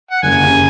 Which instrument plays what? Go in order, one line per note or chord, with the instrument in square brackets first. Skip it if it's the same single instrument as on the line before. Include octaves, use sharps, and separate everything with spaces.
[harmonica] F#5
[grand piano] F#1 [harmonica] G#5
[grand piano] C#3